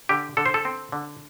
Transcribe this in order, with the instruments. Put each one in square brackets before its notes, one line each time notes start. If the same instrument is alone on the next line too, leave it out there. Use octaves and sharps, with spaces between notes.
[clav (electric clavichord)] D3 G4
D3 A4
C5
A4
C4
D3